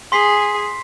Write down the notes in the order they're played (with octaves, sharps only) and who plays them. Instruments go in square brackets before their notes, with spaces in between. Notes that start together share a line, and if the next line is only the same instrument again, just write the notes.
[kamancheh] G#4 G#5 [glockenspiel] C6 B6 C7